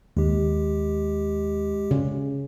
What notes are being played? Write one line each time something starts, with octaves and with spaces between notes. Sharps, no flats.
D#2 G#3 G4
C#3